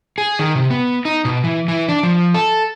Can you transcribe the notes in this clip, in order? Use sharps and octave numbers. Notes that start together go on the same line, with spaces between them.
G#4
D#3
C3
B3
D#4
B2
E3
E3
D4
F3
A4